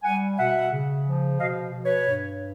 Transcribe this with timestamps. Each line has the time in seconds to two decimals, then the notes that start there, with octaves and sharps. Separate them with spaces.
0.04 G3 F#5 G#5
0.38 B2 E5 F#5
0.72 C#3
1.06 F3
1.40 B2 D#5 F5
1.74 B2
1.85 B4 C#5
2.07 G2